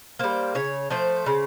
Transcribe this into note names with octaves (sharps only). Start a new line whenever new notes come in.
G3 A#3 C5
C#3 C#5
F3 A3 C5
C#3